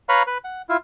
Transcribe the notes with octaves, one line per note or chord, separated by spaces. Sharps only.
B4 C#5 F5 A#5 B5 C#6
B4
F#5
E4 F4